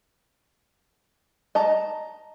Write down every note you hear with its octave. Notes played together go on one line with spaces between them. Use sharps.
D#5 A5 A#5